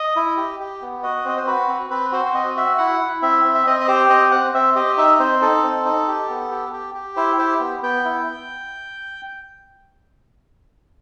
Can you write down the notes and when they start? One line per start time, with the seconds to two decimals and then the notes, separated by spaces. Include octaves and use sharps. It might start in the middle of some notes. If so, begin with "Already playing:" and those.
Already playing: D#5
0.16 E4
0.37 G4
0.60 G4
0.82 B3
1.03 F#4 D#5
1.25 C4 D#5
1.37 C5
1.47 F#4 B4
1.68 C4
1.90 C4 B4
2.12 F#4 C5
2.26 C5
2.34 C4 D#5
2.56 F#4 E5
2.78 E4 F#5
3.00 E4
3.22 C4 E5
3.44 C4
3.55 E5
3.67 C4 D#5
3.80 D#5
3.88 G4 C5
4.09 C4 D#5
4.32 C4 F#5
4.54 C4 E5
4.75 G4 D#5
4.98 D#4 E5
5.19 C4 C5
5.42 D#4 A4
5.63 C4
5.85 D#4
6.08 G4
6.30 B3
6.51 G4
6.73 G4
6.94 G4
7.16 E4 C5
7.38 G4 C5
7.60 B3
7.83 B3 G5
8.05 E4